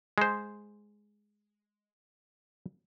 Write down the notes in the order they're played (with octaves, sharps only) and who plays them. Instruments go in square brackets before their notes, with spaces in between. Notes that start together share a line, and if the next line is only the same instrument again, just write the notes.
[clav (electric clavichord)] G#3 C5